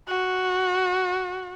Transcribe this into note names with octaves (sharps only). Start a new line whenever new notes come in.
F#4